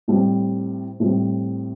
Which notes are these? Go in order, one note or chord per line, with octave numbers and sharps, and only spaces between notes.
A2 G3 C4
A2 G3 C4